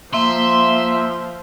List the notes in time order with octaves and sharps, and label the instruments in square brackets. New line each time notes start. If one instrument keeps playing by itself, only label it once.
[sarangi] F3 [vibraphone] A#3 [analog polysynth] E5 [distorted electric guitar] C6